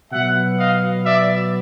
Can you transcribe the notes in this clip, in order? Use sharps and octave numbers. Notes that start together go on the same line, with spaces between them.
B2 F#3 B3 E5 F#5
D#5 F5
D5 E5